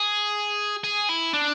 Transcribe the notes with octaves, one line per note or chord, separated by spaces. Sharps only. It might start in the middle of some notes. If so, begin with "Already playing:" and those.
Already playing: G#4
G#4
E4
D4